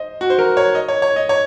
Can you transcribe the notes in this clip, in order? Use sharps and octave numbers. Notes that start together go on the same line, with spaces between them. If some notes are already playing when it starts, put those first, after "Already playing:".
Already playing: C5 D#5
F#4
C5
A#4
C#5
D#5
C#5
C#5
D#5
C#5